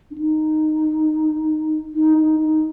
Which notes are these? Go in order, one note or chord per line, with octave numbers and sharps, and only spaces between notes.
D4
D#4
D#4
D#4
D#4